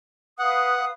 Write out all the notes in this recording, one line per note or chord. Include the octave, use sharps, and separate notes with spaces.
B4 F5 F#5 D#6